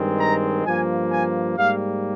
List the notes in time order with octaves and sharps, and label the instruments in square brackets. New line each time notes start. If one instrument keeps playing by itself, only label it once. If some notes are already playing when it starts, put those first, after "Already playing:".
Already playing: [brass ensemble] G2 D#3 G#3 C4
A#5
G2 F3 A#3 G#5
G#5
G#2 G3 A#3 F5